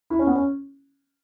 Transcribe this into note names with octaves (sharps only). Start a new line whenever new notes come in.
E4
C#4
B3
C#4